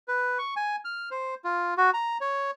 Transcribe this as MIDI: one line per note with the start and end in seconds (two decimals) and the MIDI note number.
0.08 0.38 71
0.38 0.54 85
0.56 0.76 80
0.85 1.09 89
1.11 1.35 72
1.44 1.74 65
1.77 1.90 66
1.94 2.17 82
2.21 2.51 73